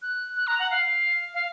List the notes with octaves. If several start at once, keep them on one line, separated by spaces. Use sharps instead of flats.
F#6
F#6
A#5
F#5
F5
F5